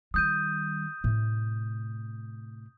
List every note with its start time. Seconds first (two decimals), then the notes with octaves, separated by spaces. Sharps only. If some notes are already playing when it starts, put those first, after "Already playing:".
0.14 D#3 G3 D#6 G6 D#7
1.04 A2 C3